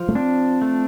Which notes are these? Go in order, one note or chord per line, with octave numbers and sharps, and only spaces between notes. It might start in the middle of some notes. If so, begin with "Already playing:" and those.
Already playing: F3
A3
C4 D4
A3